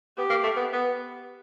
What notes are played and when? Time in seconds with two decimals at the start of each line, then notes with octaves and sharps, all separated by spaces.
0.17 B3 G4
0.30 A#3
0.43 A3
0.56 B3
0.73 B3